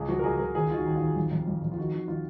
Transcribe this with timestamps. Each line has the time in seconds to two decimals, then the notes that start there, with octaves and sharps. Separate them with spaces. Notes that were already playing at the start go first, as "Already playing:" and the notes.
Already playing: C#2 G#4
0.08 F3 F#4
0.19 A#4
0.24 C#2 G#4
0.39 C#2 A#4
0.55 D#2 G#4
0.70 D#3 F4
0.76 F#4
0.86 D#2
0.96 F4
1.02 D#2
1.16 F2
1.31 F2
1.48 F2
1.63 F2
1.72 F4
1.78 D#3 F#4
1.93 D#3 F#4
2.08 D#3 F4